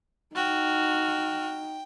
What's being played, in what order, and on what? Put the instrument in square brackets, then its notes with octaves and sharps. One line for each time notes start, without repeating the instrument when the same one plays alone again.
[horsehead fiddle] D#4 [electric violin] F#4 F6 [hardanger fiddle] G5